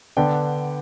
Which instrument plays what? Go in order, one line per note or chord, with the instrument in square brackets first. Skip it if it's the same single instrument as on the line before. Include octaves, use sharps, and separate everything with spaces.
[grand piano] D3 B3 D4 G5